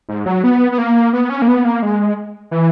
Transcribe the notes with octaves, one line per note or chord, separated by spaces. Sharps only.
G#2
F#3
B3
B3
A#3
B3
C#4
A#3
B3
A#3
G#3
E3